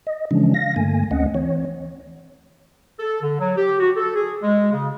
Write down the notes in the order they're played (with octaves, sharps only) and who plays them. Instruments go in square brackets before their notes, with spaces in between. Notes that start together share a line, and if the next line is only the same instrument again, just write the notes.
[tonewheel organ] D#5
C#3 E3 F3 G#3 C#4 D4
F5 A#6
G2 D3 A3 A#3 G#5
D2 A3 C4 C#4 D#5 F#5
E3 C4 C#5
[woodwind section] A4
D3
F#3
G4
F#4
A4
G#4
G#3
C#3